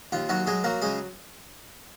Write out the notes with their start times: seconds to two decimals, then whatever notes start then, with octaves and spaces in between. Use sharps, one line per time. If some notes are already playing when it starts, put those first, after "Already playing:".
0.12 D#2 F4
0.29 D#2 F#3 F#4
0.47 F#3 G#3 G#4
0.64 F#3 A#3 A#4
0.82 C#3 G#3 G#4